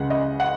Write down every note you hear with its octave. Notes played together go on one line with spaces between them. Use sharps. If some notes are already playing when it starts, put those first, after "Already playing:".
Already playing: C#2 C#3 G#3 F#5
D#5
F#5